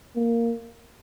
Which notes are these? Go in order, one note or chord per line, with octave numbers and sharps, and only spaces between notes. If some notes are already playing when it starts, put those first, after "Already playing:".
A#3